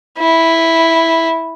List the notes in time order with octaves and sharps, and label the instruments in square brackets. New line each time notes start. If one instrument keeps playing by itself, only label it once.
[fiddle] E4